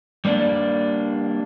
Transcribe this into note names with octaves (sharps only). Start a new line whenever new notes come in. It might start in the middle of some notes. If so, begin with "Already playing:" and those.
G3 A#3 D4 D5